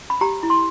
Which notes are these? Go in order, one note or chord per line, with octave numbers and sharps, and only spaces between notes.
B5
G4 A#5
E4
C6